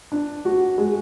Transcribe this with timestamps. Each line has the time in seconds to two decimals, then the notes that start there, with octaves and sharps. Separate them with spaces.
0.12 D4
0.45 F#4
0.78 G#3